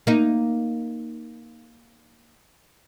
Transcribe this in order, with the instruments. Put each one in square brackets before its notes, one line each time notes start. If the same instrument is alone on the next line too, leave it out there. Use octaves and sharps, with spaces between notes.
[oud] A#3 D#4